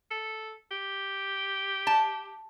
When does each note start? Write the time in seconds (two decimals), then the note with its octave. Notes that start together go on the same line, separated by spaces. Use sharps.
0.11 A4
0.71 G4
1.87 A5